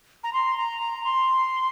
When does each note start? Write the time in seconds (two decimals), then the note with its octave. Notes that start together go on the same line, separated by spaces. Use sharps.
0.24 A#5
0.33 C6
0.57 A#5
0.81 A#5
1.04 C6